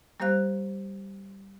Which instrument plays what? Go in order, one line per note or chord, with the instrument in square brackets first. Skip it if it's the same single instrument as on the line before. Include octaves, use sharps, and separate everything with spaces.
[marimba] G3 A#3 G4 C5 F5 F#6